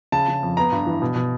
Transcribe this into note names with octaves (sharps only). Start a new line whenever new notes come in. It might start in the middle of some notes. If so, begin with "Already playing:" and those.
C#3 A5
C#3
F2
B3 A#5
G2
E3
B2
B2